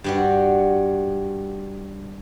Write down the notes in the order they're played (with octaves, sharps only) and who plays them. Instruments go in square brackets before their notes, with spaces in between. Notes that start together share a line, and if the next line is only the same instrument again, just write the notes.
[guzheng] G2 G3 F#4